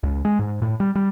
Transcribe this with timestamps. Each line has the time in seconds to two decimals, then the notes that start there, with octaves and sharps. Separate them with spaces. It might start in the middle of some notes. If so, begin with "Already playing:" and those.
0.03 C#2
0.25 G#3
0.39 G#2
0.62 A2
0.80 G3
0.95 G3